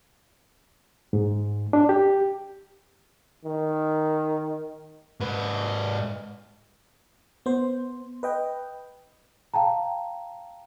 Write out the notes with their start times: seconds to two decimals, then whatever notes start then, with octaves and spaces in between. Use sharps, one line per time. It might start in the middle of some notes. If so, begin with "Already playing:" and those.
1.13 G#2
1.73 D4
1.89 G4
3.45 D#3
5.20 G#2 B4
7.46 B3 C5
8.23 B4 D#5 G5
9.54 F5 G5 A5 A#5